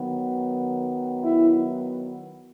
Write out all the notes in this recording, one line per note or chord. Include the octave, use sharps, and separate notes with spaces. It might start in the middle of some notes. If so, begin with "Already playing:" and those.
Already playing: D#3 F#3 B3
E4